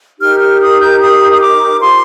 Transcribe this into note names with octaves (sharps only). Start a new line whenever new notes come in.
D#4 G4 A#4 F6
F6
D#6
G6
D#6
D#6
D6
F4 C5 C6